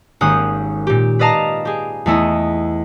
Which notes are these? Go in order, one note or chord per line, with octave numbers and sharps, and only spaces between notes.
G#1 A#3 C#4 G4 D#6 F#6
A#2 G4
B4 D5 D#5 F5 A5 A#5
G4 G#4
E2 A3 E4 D#5